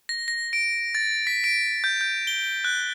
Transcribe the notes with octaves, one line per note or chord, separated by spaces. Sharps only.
A#6
A#6
D7
A6
B6
D7
G6
G6
G7
F#6